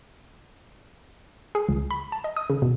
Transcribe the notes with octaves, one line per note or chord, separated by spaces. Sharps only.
G#4
C#2
B5
A5
D#5
D#6
C#3
B2